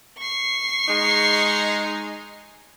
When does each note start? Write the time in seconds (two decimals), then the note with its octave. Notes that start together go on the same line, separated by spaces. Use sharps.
0.18 C#6 C7
0.88 G#3 D#4